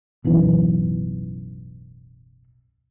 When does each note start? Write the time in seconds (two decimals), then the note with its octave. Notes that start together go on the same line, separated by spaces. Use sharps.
0.24 D1 B1 F#2 E3